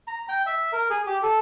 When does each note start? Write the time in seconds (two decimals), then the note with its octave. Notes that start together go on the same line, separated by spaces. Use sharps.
0.08 A#5
0.29 G5
0.46 E5
0.73 A#4
0.90 G#4
1.07 G4
1.23 A4